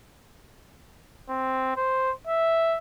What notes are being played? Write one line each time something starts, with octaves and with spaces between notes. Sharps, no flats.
C4
C5
E5